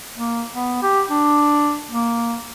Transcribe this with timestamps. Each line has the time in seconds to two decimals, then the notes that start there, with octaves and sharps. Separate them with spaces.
0.17 A#3
0.53 B3
0.82 G4
1.10 D4
1.90 A#3